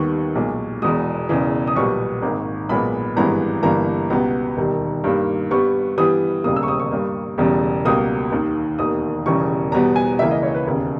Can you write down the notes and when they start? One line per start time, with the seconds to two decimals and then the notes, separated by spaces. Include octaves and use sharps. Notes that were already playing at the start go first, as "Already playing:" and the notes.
Already playing: D#2 D#3 G3 B3 C#6
0.35 B1 A#2 G#3
0.82 E1 E2 B2 G#3 D#6
1.29 E1 E2 C#3 E3
1.67 D#6
1.76 B1 A#2 G3 B3 C#6
2.22 G#1 G#2 D#3 A#3
2.69 B1 A#2 G#3 B3 B5
3.16 G#1 G2 E3 G#3 B3 A#5
3.63 G1 G2 E3 A#3 A#5
4.10 C#2 B2 G3 B3 A#5
4.57 E1 D#2 D#3 G3
5.04 G2 D#3 G3 A#3
5.51 G2 G3 B3 C#6
5.98 G2 E3 G3 B3 D#6
6.44 E1 D#2 C#3 G3 A#3 D#6
6.56 E6
6.63 C#6
6.68 D#6
6.80 C#6
6.91 G2 G3 A#3
7.38 E1 E2 C#3 G3
7.85 C#2 B2 G3 A#3 D#6
8.32 D#2 D#3 A#3
8.79 E1 D#2 D#3 A#3 D#6
9.26 E1 E2 C#3 E3 G3 C#6
9.72 E2 B2 G3 B3 A#5
9.96 G#5
10.19 C#2 C#3 E3 A#3 E5
10.31 D#5
10.43 C#5
10.54 B4
10.66 E1 D#2 C#3